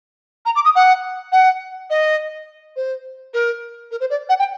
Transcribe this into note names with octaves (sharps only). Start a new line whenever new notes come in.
A#5
D6
D#6
F#5
F#5
D#5
C5
A#4
A#4
C5
D5
F#5
G5